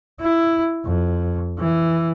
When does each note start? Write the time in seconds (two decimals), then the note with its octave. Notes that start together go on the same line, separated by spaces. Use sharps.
0.21 E4
0.86 F2
1.59 E3